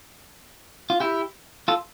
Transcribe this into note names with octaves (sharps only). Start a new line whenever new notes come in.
F4
E4 G4
F4 A4